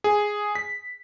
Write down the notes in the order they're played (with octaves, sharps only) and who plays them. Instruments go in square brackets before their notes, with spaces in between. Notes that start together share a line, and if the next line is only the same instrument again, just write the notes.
[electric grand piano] G#4
B6